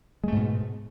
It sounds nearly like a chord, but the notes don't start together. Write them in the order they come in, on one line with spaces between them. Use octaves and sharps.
G#3 A3 G#2 B2